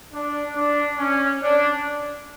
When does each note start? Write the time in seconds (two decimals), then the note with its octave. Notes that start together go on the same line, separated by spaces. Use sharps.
0.11 D4
0.54 D4
0.98 C#4
1.41 D4